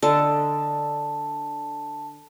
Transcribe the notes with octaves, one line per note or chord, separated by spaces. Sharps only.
D3 A4 D#5 A5